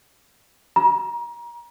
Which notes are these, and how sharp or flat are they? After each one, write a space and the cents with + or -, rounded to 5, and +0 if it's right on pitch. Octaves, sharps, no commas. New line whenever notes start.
A#5 +30